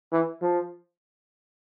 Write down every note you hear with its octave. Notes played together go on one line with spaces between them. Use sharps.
E3
F3